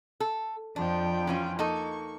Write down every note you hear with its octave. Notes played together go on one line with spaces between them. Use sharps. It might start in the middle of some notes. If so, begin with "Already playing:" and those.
A4
F2 F3 D4 G5
E3 C#4 F4
A#3 D#4 A4 C#6